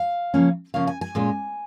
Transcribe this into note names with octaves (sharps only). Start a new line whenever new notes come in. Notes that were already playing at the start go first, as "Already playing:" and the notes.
Already playing: F5
C#3 F3 A#3 C#4
C#3 F3 A#3 C#4 F5
G#5
G#5
A#2 G#3 C#4